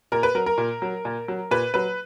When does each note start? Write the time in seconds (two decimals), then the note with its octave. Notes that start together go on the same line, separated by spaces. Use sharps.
0.12 A#2 A#4
0.23 B4
0.35 F#3 A#4
0.46 A#4
0.58 A#2
0.82 F#3
1.05 A#2
1.28 F#3
1.51 A#2 B4
1.74 F#3 B4